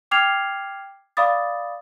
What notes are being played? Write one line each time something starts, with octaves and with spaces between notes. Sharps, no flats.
G5 D6 F6 G#6 C7 F7
D5 F5 B5 D6 D#6 A6